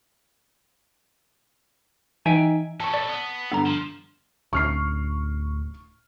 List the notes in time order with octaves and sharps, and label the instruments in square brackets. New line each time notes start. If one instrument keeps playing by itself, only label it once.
[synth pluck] E3 [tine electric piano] D#4 [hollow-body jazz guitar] E5 G5 G#5
[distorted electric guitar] C#4 A4 [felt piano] A5 C#6
[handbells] D5 [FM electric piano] B5
[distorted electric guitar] B3
[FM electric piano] G2 D3 [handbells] B3 A#5
[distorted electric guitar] F3
[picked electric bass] D1 D2 C#4 [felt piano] C#6 F6 C7